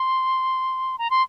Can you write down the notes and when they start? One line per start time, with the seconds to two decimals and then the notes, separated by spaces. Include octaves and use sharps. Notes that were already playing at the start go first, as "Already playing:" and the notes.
Already playing: C6
0.98 A#5
1.10 C6